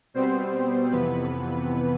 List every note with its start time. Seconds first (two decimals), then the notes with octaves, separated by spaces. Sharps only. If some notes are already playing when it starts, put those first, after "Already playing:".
0.14 B2 G3 B3 C4 C5
0.91 F2 C3 E3 B3 B4